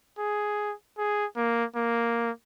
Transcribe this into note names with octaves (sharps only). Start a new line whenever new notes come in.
G#4
G#4
A#3
A#3